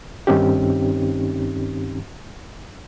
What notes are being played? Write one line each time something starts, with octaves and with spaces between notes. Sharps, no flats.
G2 D#3 C4 C#4 D#4 G4